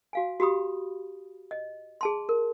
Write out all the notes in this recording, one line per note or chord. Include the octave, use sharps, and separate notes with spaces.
F#4 F5 G#5
F#4 G4 B5 D#6
D#5
G#4 A5 C6
A#4